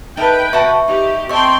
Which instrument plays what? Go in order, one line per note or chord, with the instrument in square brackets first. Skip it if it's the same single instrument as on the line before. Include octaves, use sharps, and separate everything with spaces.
[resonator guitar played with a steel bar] A3 D#4 A#4 [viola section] B4 G5
[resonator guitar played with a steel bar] C3 F#4 A5 [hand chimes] E5 C#6
[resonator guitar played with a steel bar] D#4 [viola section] G4
[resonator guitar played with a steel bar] A3 [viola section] C4 G5 C6 [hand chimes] D#5 C#6